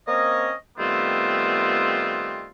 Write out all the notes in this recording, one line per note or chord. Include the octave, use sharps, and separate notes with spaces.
A#3 C4 C#4 C#5 D#5
D#3 G3 A3 B3 C4 F4